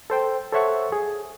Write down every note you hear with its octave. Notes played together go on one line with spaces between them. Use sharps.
A4 C5 G5
A4 C5 C#5 E5 F#5 C#6
G#4